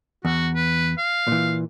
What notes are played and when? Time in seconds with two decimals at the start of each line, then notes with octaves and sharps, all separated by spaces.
0.25 E2 F#4
0.55 B4
0.98 F5
1.28 A#2 E3